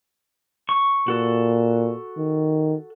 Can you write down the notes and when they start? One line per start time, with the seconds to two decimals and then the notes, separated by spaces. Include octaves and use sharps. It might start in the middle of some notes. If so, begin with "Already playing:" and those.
0.69 C#6
1.08 A#2 F#4 A4
2.17 D#3